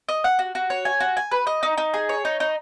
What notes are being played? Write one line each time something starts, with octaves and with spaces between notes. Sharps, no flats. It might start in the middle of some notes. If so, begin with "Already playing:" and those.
D#5
F#5
F#4
F#4
C#5
G#5
F#4
G#5
B4
D#5
D#4
D#4
G#4
C#5
D#4
D#4